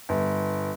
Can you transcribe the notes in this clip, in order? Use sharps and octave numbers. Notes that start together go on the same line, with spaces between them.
G1